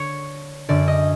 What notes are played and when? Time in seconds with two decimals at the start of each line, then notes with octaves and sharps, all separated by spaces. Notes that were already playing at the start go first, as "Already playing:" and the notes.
Already playing: D3 C#5
0.69 F#2 D3 D5
0.88 D#5